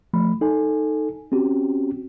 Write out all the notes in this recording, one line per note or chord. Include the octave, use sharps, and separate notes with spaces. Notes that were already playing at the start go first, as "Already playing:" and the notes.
F3 A3 B5
D#4 A4 G#5
C4 C#4 F#4 G4